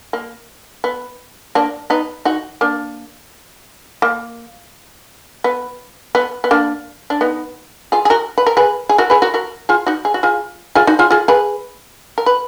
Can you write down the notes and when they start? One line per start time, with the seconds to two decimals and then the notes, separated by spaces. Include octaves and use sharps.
0.13 A#3
0.84 B3
1.55 A#3 D4
1.90 B3 D#4
2.25 D#4 F#4
2.61 A#3 D4
4.02 A#3
5.44 B3
6.15 B3
6.44 B3
6.51 A#3 D4
7.10 D4
7.21 B3 D#4
7.92 F4 G#4
8.05 G#4
8.10 F#4 A#4
8.38 B4
8.46 A#4
8.57 G#4 B4
8.89 G#4
8.98 F#4 A#4
9.10 G#4 B4
9.22 F#4 A#4
9.34 F#4 A#4
9.69 F4 G#4
9.87 D#4 F#4
10.05 G#4
10.14 F#4
10.23 F4 G#4
10.75 F4 G#4
10.87 D#4 F#4
10.99 F4 G#4
11.10 F4 G#4
11.28 G#4 B4
12.18 A#4
12.26 B4